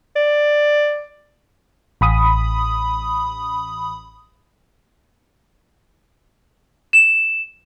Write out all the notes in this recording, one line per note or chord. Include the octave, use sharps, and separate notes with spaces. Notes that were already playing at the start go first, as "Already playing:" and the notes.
D5
A1 B5 D#6
E7